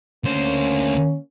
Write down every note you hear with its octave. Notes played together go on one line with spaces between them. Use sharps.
D2 A#3 C#4 C5